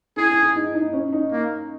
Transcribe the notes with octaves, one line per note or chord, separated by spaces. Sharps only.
E4 G#4
E4
E4
D#4
D#4
C#4
D#4
A#3